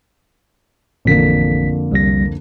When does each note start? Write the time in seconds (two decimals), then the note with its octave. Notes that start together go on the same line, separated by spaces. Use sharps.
1.05 A1 F2 D3 A#3 B6
1.92 C2 G3 A#6